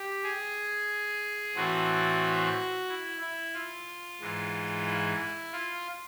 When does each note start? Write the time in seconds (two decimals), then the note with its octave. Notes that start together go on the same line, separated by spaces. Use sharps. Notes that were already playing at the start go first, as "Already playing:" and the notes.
Already playing: G4
0.23 G#4
1.56 A2 E3 A3 C4 F#4
2.89 E4
3.21 E4
3.54 F4
4.20 G#2 E3 G#3
4.87 E4
5.53 F4